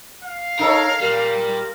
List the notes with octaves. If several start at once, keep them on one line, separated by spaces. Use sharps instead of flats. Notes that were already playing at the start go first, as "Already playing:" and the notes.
F5
D#4 A4 A#4 C#5
A#2 G3 A#4